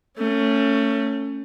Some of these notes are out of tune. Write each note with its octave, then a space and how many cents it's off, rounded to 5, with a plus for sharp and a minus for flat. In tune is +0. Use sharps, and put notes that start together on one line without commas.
A3 +25 C#4 +0